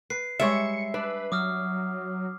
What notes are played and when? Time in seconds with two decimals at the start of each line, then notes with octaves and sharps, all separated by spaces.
0.10 B4 C7
0.40 G3 G#3 C#5 E5 C#7
0.94 D4 B4
1.32 F#3 D6 D#6 F6